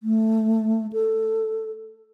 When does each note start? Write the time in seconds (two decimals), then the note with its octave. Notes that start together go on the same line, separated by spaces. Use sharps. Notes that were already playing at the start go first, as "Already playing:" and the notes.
0.03 A3
0.93 A4